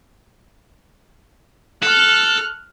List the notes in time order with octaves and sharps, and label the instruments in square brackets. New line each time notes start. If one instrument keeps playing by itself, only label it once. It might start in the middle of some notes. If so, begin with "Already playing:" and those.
[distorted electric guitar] A4 [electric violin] F6 F#6